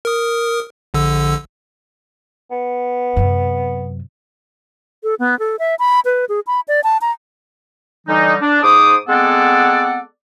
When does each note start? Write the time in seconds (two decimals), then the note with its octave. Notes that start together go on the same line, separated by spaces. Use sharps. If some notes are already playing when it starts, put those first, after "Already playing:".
0.05 A#4 D#6
0.94 A#1 D3 E6
2.51 B3
3.16 F#2 C3
5.04 A4
5.19 B3
5.39 A4
5.59 E5
5.79 B5
6.05 B4
6.29 G#4
6.47 B5
6.68 D5
6.84 A5
7.01 A#5
8.07 D3 E3 G3 D#4
8.42 D4
8.62 G#2 C5 D6 D#6
9.08 G#3 B3 C4 A4 D5 F#5